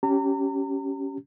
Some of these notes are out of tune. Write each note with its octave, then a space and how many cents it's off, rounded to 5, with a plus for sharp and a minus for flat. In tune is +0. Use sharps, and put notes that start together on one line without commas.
C#4 +0 G4 -20 A#5 -40